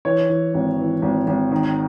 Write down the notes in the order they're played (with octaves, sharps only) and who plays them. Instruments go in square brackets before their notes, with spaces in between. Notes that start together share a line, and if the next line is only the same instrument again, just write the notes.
[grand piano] E3 C#5
E3
G#1
E3
G#1
G#1
D#3